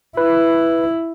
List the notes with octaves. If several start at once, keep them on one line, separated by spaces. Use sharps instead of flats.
E4 B4